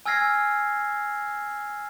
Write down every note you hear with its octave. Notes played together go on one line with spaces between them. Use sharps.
G#5 E6 F6 G#6 A#6 C7